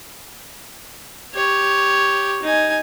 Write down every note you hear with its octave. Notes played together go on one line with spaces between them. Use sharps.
G4 C#5
D#4 G#5